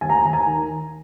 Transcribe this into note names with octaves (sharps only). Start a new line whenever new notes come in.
D#2 G#5
A#5
G#5
D#2 A#5
G#5
A#5
D#3